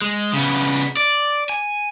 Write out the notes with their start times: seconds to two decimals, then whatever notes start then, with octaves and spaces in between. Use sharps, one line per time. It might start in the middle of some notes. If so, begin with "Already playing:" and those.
0.02 G#3
0.33 C#3 B3
0.97 D5
1.49 G#5